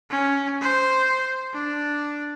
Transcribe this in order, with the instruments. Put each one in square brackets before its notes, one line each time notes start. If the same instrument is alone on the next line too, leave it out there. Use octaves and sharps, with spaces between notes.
[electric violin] C#4
C5
D4